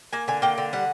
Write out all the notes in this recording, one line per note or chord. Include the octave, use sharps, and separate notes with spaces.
A#3 G#5
D3 G#5
A#3 G5
D3
G3 F#5